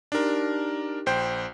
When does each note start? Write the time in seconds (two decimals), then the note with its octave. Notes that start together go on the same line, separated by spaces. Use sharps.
0.12 D4 D#4 G4 A#4
1.06 A#1 C5 G5